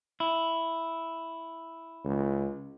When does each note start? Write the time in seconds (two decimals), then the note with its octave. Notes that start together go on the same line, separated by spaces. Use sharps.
0.20 E4
2.04 C#2